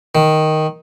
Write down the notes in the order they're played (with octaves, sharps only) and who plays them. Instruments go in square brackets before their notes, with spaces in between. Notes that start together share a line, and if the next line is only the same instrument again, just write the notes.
[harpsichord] D#3